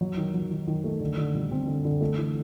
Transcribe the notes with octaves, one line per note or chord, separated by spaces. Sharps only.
F#3
D#3
F#3
D#3
D#3
A3
D3
D3
G3
C4
D3
D3
A3
E3